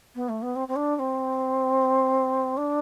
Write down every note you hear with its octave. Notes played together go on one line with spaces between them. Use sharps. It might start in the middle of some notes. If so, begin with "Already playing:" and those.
B3
A3
B3
C4
C4
D4
D4
C4
D4